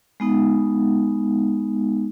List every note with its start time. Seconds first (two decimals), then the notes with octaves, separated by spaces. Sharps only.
0.20 G#3 B3 D#4